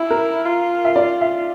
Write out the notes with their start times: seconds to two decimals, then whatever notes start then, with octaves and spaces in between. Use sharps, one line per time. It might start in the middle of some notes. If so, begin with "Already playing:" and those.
Already playing: E4
0.10 A#4
0.45 F4
0.85 E5
0.96 D5
1.21 E5